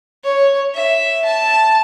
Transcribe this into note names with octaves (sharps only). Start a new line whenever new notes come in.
C#5
E5
A5